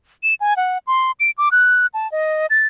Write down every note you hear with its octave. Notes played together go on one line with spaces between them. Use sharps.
E7
G#5
F#5
C6
D7
D6
F#6
A5
D#5
A6